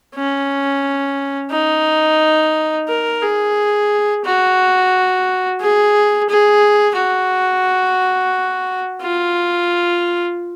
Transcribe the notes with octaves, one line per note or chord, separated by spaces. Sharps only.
C#4
D#4
A#4
G#4
F#4
G#4
G#4
F#4
F4